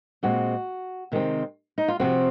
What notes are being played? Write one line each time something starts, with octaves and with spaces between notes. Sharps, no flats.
A#2 G#3 C4 F#4
C3 D#3 G#3 C4
D#4
F4
C3 F3 C4 F#4